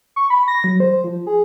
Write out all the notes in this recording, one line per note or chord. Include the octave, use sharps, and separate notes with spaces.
C#6
B5
A#6
F#3
C5
F3
G#4